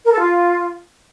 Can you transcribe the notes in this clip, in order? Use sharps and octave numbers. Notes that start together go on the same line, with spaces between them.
A#4
A4
F4